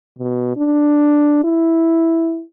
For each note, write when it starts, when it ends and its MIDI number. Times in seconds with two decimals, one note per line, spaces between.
0.19 0.55 47
0.57 1.41 62
1.44 2.43 64